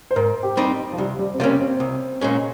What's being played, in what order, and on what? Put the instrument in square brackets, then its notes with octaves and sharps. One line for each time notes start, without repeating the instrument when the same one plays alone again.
[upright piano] C5
[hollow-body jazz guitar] G#2 [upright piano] A#4
[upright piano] G4
[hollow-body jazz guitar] G3 C4 D#4
[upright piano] F3
[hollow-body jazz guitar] C2 [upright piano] G3
[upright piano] G3
C4
[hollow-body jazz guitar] C3 G3 C#4 [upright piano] A#3
[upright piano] C4
[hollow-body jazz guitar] C2
A#2 G#3 C#4